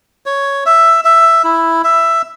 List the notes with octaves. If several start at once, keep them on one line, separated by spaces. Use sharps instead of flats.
C#5
E5
E5
E4
E5